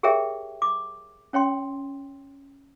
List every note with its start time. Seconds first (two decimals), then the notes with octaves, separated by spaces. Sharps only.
0.03 G4 G#4 A#4 C#5 E5 G5
0.62 D6
1.33 C#4 C#5 G5 C6